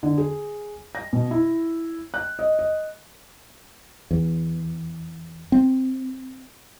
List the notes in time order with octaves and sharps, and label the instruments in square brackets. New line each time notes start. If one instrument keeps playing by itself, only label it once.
[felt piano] D3
G#4
A#6
B2
E4
F#6
D#5
D#5
[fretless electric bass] E2
C4